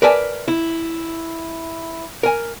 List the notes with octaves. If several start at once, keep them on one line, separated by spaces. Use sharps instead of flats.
A#4 B4 D5 E5 G#5 A5
E4
A#4 G#5